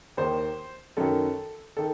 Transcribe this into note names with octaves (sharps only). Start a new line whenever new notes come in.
D#2 D#3 C5
F#2 D#3 A4
D#3 A4